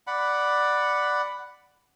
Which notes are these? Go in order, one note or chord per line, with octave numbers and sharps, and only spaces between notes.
D5 F#5 B5